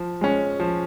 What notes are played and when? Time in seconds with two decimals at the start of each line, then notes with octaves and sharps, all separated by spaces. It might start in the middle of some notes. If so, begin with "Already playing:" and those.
Already playing: F3
0.21 G#3 C#4
0.60 F3